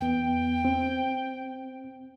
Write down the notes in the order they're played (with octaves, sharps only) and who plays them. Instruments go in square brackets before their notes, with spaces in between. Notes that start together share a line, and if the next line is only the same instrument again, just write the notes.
[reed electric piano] E2 B3 [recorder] G5
[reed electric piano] C4